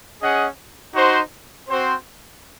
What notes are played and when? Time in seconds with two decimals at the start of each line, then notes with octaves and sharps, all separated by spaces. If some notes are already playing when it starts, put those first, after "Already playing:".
0.22 C#4 G#4 D#5 F#5
0.94 D#4 F#4 C5
1.68 C4 F#4 C5